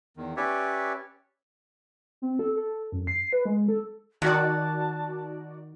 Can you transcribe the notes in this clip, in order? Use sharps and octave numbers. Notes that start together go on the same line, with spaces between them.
E2 D#3
C#4 G4 B4 C#5 D5 E5
C4
A4
A4
F#2
C7
B4
G#3
A4
D#3 D#4 F#4 D5 F#5 A5